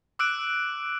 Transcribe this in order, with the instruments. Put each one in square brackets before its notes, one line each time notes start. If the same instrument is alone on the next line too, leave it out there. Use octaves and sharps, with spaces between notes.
[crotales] D6 E6 F#6 D7